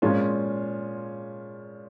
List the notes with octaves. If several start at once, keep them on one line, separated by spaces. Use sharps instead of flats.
A#2 F3 G#3 C#4 F4